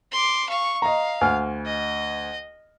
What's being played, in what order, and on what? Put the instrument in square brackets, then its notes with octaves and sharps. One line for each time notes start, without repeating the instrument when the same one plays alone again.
[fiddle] C6 D6
F5 C#6
[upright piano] D#5 A#5 [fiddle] F5
[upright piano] D2 G#5 F6
[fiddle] D#5